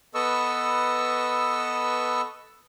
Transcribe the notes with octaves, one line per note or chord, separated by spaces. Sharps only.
B3 A4 B4 D#5 C#6 E6